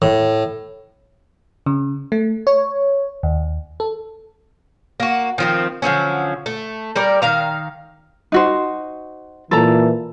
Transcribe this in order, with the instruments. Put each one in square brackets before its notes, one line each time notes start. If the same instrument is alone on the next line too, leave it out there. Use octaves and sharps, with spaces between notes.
[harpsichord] A2
[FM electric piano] C#3
A3
C#5
D#2
A4
[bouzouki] A#3 F#4
D#3 F3 C4
D3 F3 F#3 C#4
A3
G3 A#4 D5
D#3 F5 A#5
[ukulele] D#4 F#4 C5
[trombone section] A#2 E3 [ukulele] A4 A#5